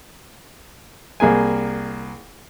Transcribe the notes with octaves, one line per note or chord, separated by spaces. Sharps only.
C2 A#3 G#4 G#5